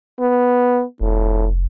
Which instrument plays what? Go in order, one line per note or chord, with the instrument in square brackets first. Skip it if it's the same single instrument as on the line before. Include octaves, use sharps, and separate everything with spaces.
[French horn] B3
[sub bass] F1 [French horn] A2